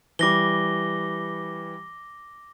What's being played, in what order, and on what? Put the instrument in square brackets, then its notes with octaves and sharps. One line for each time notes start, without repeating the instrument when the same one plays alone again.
[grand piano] E3 G3 [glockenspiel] D6 A#6 G7